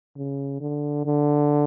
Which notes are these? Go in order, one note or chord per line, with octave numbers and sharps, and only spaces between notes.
C#3
D3
D3